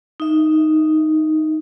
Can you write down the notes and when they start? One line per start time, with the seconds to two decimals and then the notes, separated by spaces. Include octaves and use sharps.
0.20 D#4 E5